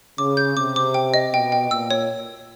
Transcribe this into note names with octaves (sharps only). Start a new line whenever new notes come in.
C#3 D6
G6
C3 D6
D6
G5
D#5
B2 G5
G5
A#2 E6
C#5